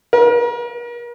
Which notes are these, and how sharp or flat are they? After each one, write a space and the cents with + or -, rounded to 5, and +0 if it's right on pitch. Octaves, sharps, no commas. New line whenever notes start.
A#4 +40